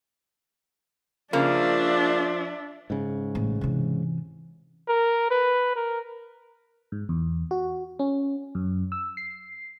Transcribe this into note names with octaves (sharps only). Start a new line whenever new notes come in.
C#3 F3 A#3 D4 E5
G#2 C#3
A1
C3 E3
A#4
B4
A#4
G#2
E2
F#4
C#4
F#2
E6
C7